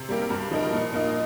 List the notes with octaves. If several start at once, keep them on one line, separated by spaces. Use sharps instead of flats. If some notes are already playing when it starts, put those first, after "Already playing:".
Already playing: C3
G3 A#3 G4 A#4
G2
F3 D#4 A#4
A#2
A#3 D#4